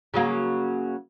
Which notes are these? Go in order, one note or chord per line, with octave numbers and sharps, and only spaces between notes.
C#3 F#3 A#3